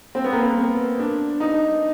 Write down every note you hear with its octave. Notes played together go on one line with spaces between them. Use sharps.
C4
B3
A#3
B3
D4
D#4